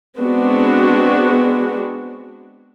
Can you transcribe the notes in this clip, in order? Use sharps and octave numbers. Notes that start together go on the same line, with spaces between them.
G#3 B3 C4 D4 F#4